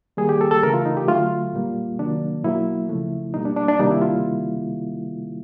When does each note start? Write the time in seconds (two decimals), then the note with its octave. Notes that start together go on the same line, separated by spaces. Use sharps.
0.17 D#3 G3 A#3 G#4
0.29 G4
0.41 A4
0.51 A4
0.63 C#3 E3 A3 A#4
0.74 F4
0.86 D#4
0.97 G4
1.08 D3 F#3 A3 F4
1.53 A#2 G3 A#3
1.99 C3 D#3 F#3 A#3 D4
2.44 B2 F#3 A#3 E4
2.89 C#3 F3 A3
3.34 B2 G3 A#3 D#4
3.45 D4
3.56 D4
3.68 D4
3.79 C3 D#3 G3 A#3 D#4
3.91 E4
4.02 F4